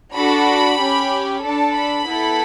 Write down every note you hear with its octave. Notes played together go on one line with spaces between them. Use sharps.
D4 F#4 A4 B5
C#4 G4
D4 A4 A5
B5
B3 E4 A4